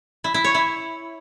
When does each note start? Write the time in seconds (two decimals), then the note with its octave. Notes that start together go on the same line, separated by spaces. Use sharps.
0.24 E4
0.34 E4
0.44 C#5
0.55 E4